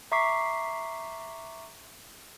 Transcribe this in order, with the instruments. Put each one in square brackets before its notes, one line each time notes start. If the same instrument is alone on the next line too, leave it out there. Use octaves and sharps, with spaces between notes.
[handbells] E5 A#5 C#6 D6 B6 C7